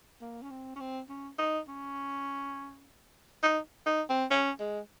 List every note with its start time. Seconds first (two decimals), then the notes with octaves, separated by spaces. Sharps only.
0.21 A#3
0.42 C#4
0.51 C4
0.76 C#4
0.80 C4
1.10 C#4
1.39 D#4
1.68 C#4
3.43 D#4
3.86 D#4
4.09 C4
4.31 C#4
4.60 G#3